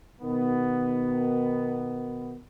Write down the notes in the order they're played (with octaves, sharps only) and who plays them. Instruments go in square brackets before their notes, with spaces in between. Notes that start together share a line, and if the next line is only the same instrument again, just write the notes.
[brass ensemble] B2 D#3 B3